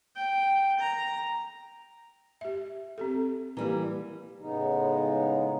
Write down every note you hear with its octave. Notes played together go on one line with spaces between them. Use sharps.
G5
A#5
G4 E5
C4 G4 A4
E3 G3 A#3 G4 A#5
A2 C#3 G#3 B3 D#4